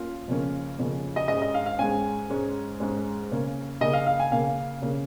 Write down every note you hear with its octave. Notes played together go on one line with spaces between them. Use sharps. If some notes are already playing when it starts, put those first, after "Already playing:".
Already playing: A#3 C#4 F4
F2 C#3 A#3 C#4
F2 C#3 A#3 C#4
D#5
G#2 G#3 C#4 D#5
D#5
F5
F5
G#2 G#3 C#4 G#5
G#2 G#3 C#4
G#2 G#3 C#4
C#3 A#3 C#4
C#3 A#3 C#4 D#5
F5
F5
G#5
C#3 A#3 C#4 F5
C#3 A#3 C#4